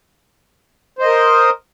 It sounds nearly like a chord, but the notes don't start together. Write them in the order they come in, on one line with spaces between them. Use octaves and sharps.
C5 D#5 A#4